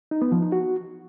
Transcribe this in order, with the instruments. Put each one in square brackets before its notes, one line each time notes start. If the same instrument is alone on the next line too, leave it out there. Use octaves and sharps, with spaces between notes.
[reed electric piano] D#4
B3
F3
D#4
F#4